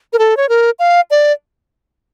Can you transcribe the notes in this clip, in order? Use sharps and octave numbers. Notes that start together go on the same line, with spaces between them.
A#4
A4
C#5
A#4
F5
D5